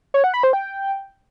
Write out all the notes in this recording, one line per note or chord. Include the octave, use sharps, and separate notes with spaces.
C#5
F#5
B5
C5
G5